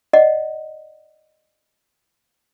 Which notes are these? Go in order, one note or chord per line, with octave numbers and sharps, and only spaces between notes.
D5 D#5 F#5